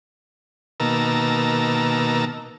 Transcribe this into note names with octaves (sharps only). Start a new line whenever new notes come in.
B2 D#3 A#3 A5 A#5 E6